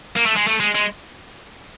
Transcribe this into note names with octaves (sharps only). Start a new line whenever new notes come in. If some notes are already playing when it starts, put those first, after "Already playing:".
A#3
A3
G#3
A3
G#3
G#3